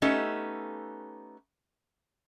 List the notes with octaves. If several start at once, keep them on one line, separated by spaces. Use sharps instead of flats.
A3 B3 C#4 D#4 G4 A4